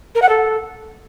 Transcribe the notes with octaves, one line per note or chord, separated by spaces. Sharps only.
A#4
F#5
A4